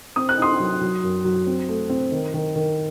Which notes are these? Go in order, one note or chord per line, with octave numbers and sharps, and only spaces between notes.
C4 D#6
F#6
D#4 C6 D#6
F#3
F#3
F#2
F#3
C4
A3
C4
D#3
D#3
D#3